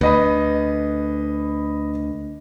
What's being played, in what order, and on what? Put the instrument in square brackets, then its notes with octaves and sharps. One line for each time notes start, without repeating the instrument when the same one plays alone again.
[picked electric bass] D2 [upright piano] B4 D#5 B5